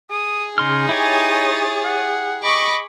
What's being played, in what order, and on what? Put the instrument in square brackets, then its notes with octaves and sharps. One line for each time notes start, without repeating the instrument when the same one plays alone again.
[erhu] G#4 [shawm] D#6
[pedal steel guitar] C#3 C6 F6 [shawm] D#4
[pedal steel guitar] E4 G4 G#5 [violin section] C#5 D#6 A6
[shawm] F#5
[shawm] D#5 [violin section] B5 C#6 D6